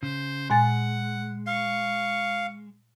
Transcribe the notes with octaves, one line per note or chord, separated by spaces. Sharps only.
C#3 C5
A#2 G#3 F#5 G#5 A6
F5 C#6